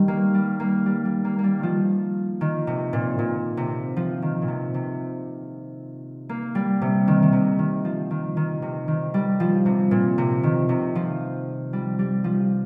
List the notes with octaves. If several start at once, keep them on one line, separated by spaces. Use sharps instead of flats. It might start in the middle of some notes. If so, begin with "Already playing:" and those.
Already playing: D#3 G3
A#3
G3
A#3
G3
G3
A#3
A#3
G3
D#3 F3
D#3
C3
A#2
A#2
C3
F3
D#3
A#2
C3
C3
A#3
G3
C3
D#3
D#3
C3
D#3
F3
D#3
D#3
C3
D#3
G3
F3
C3
A#2
C3
D#3
C3
F3
G3
G3
F3